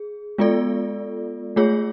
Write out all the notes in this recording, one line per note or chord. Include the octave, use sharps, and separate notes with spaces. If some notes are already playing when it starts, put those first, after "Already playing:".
Already playing: G#4
G#3 B3 F4 A4 D5
A3 F4 G#4 C#5